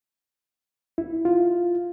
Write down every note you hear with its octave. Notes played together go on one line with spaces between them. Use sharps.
E4
F4